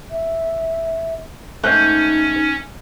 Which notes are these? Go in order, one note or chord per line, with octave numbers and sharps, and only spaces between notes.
E5
G#2 A3 C#4 D#4 F#6 G6